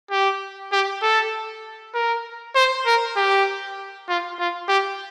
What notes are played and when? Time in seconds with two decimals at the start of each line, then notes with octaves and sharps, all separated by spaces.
0.11 G4
0.72 G4
1.02 A4
1.94 A#4
2.55 C5
2.86 A#4
3.16 G4
4.08 F4
4.39 F4
4.68 G4